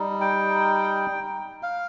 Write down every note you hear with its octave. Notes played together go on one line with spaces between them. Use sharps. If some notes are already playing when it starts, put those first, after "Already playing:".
Already playing: G3 D#4
G5
F5